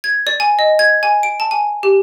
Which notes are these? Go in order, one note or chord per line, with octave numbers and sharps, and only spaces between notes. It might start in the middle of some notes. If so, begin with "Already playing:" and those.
G#6
D5
G#5
D#5
G#6
G#5
D7
A5
G#5
G4